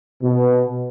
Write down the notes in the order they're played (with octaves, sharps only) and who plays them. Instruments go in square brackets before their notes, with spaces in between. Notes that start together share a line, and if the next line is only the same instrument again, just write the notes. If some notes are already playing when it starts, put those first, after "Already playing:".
[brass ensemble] B2